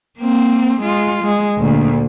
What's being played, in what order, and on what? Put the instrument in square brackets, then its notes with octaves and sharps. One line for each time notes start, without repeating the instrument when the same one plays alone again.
[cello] A#3 C4
G#3 F4
G#3
D2 A#2